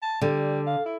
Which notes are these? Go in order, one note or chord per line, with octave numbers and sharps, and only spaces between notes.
A5
D3 G3
F5
E4